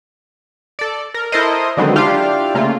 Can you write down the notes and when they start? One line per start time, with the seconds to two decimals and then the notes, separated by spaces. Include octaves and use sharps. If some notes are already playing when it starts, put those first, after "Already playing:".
0.79 A4 D5
1.14 A#4
1.32 E4 A4 A#4 C5 D#5
1.77 D3 D#3 F#3 G#3 B3 C4
1.96 D4 E4 F4 G4 F5
2.55 C#3 A3 A#3 F4